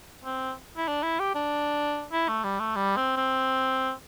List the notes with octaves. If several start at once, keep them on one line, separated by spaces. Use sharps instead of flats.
C4
E4
D4
E4
G4
D4
E4
A3
G3
A3
G3
C4
C4